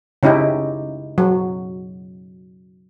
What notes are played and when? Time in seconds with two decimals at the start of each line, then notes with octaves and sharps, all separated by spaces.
0.23 C#3 C#4 D#4 E4 G4
1.18 F#3